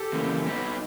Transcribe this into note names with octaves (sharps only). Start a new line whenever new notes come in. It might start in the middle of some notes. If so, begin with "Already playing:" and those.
Already playing: G4 A4
F#2 C#3 E3 G3 A#3
G3 B3 D#4 F#4 B4